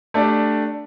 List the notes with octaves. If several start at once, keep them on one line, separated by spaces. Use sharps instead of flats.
A3 D4 G4 D5